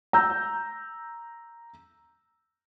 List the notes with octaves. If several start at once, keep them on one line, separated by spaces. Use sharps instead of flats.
A#5 E6 G6